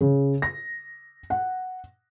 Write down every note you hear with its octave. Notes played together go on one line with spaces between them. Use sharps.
C#3
A#6
F#5